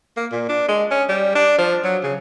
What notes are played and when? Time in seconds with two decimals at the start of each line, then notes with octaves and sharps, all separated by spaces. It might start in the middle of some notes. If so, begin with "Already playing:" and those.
0.17 A#3
0.32 A#2
0.49 D4
0.68 G#3
0.91 C#4
1.09 G3
1.35 D4
1.58 F3
1.84 F#3
2.03 C#3